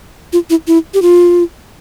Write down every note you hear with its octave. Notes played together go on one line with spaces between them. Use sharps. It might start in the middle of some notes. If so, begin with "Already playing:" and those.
F4
E4
E4
G4
F4